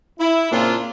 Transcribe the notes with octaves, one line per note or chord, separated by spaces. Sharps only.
E4
A#2 C#3 A#3 C4 D4 F4